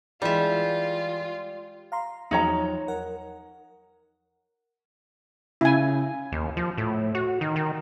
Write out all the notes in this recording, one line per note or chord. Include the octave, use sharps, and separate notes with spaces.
E3 G3 G#3 F4 E5
F5 A#5 C6
E2 F3 F#3 D#4 C#5 A#5
A#4 F#5
C#3 E4 G#5
D#2
F3
A2
F#4
D#3
D#3